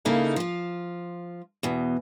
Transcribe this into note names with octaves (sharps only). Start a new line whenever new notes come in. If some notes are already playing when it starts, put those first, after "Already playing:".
C#3 A#3 D#4 E4 A4
F3 F4
E2 B2